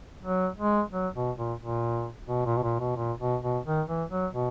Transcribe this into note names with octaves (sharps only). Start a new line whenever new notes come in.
F#3
G#3
F#3
B2
A#2
A#2
B2
A#2
B2
A#2
B2
A#2
B2
B2
D#3
E3
F#3
B2